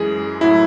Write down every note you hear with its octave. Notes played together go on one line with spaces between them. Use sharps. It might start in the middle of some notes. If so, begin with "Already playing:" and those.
Already playing: F#2 E3 G#3 G#4
A2 F#3 E4